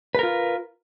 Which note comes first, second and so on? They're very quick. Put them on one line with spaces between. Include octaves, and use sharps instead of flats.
B4 A#4 F4